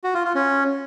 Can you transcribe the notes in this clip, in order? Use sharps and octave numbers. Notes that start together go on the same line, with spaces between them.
F#4
F4
F4
C#4